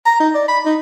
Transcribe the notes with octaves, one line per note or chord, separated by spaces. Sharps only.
A#5
D#4
D5
B5
D#4